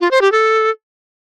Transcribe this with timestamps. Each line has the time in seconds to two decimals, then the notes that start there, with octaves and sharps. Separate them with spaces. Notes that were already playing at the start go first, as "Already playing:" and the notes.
0.01 F4
0.11 C5
0.22 G4
0.32 A4